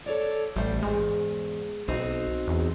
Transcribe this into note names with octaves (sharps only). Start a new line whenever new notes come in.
A4 C#5 D5
A1 G3 A3 C5
E2 G#2 G#3
B1 C4 D#4 F#4
E2